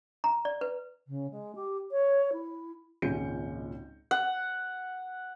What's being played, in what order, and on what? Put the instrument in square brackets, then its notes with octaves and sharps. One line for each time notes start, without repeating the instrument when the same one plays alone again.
[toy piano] A#5
D5
B4
[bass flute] C#3
G#3
G4
C#5
E4
[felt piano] G#1 C#2 A#2 C#4 G6 C#7
[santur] F#5